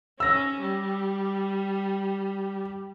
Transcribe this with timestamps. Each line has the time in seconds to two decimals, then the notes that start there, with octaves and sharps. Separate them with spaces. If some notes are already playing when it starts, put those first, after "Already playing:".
0.20 C#4 E6 A#6
0.61 G3